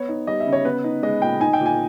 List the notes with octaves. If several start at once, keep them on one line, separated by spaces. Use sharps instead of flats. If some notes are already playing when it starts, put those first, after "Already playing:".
Already playing: B3 C#5
D#4
G3 D#5
E5
C#3
C#5
B3 B4
D#4
G#3 D#5
A#2 G5
D#4 G#5
G5
A#2
G#5